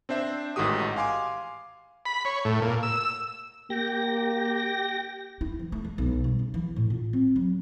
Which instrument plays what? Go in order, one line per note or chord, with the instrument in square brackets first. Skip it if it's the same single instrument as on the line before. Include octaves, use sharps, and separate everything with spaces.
[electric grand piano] C4 D4 C5 E5
A1 G#2 D#3 F#4 G4 D#6
F5 G#5 C6 D6
[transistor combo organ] B5
C#5
A2
A#2
E6
[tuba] A#3 [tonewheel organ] G4 G5 A#6
[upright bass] E4
E3
A3
G#3
B1
G3
C#3
E3
A2
F4
C4
F#3